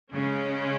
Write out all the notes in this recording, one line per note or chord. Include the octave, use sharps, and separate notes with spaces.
C#3 G#3 C#4